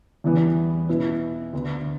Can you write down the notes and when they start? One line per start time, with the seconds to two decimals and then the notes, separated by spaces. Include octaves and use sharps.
0.24 E2 E3 G3 B3
0.89 B2 B3 E4 B4
1.53 D2 D3 B3